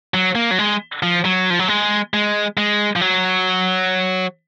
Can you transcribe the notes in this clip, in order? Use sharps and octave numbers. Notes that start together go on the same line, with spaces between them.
F#3
A#3
F#3
G#3
F3
F#3
F3
F#3
G#3
G#3
G#3
F3
F#3